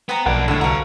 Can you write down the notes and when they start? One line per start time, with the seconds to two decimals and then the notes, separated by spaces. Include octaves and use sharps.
0.09 B3 C5 G5 A#5
0.26 B1 A#3 D4 F#5
0.48 A2 D3 E5 F#5
0.61 C2 F#4 B4 F5 A#5